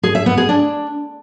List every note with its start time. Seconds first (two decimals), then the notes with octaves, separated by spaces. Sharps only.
0.03 G#4
0.15 E5
0.26 B3
0.37 G#4
0.49 D4